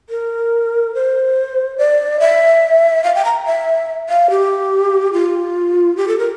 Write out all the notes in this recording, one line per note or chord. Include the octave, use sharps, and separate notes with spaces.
A#4
C5
D5
E5
F5
G5
A#5
E5
F5
G4
F4
G4
A4
A#4